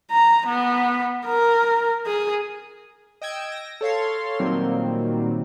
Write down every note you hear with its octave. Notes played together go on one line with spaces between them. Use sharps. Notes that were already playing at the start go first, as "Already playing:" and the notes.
A#5
B3
A#4
G#4
D#5 G5 E6 G#6 D7
A#6
A4 C#5 F5 C6
A#2 D#3 F#3 G3 A#3 C4